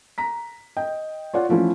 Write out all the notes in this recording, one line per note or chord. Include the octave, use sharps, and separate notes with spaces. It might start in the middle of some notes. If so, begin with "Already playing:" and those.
A#5 B6
D#5 G5
F4 C#5 D5 F#5
E3 F3 A3 C#4 E4